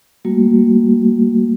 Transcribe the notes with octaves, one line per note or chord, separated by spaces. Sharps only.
G3 A3 A#3 F#4